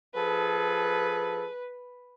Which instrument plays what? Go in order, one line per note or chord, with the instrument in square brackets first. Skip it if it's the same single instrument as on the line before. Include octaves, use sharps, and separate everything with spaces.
[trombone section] F3 G#4 A4 [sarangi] B4